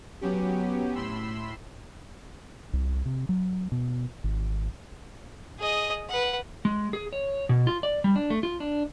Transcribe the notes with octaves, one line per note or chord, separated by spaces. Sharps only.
F#3 B3 C#4 G4
A2 B5 C6 E6
C2
C3
F#3
B2
G#1
G#4 D#5
B4 F#5
G#3
G#4
C#5
B2
F4
D5
G3
D4
A3
F4
D4